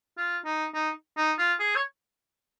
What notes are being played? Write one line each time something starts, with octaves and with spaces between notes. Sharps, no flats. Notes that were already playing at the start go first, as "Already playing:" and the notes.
F4
D#4
D#4
D#4
F4
G#4
C#5